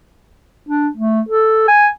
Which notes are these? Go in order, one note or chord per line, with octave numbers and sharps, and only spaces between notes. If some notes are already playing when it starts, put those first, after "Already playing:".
D4
A3
A4
G#5